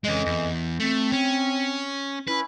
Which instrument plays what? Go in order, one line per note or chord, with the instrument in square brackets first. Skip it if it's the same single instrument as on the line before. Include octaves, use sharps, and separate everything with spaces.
[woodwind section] F2 E3 D#5 [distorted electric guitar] G#3 C#4
[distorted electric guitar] E2
[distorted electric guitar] A3 [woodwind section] C4
[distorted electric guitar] C#4
[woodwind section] C#4 E4 [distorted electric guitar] B4